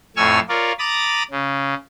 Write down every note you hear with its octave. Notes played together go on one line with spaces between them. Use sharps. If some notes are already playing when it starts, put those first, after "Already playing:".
F2 A2 G#5 C#6 E6 F6
F4 A#4 C#5 D5
A#5 B5 D6 D#6 A6
C#3